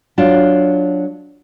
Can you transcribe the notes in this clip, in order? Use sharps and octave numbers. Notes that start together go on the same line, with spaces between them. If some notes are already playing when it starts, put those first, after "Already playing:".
F#3 D4 F4